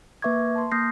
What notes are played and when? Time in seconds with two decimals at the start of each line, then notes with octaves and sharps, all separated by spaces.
0.22 A#3 B4 E5 C#6 D6 G#6
0.56 A5 C6
0.71 A#3 D#6 F6 G6 A#6 C7